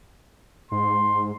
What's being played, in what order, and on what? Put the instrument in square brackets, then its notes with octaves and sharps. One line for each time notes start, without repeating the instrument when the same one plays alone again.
[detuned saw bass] G#2 [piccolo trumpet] C6